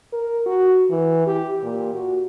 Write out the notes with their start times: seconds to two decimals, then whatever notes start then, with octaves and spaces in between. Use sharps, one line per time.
0.12 A#4
0.46 F#4
0.90 E3
1.27 G4
1.63 A#2
1.95 F#4